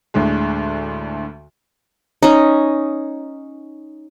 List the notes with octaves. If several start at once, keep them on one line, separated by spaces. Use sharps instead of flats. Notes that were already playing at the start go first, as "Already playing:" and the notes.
D2 A2 D3 G#3
C#4 D#4